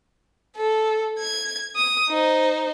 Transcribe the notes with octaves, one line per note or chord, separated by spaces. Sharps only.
A4
G#6
D#6
D#4 C5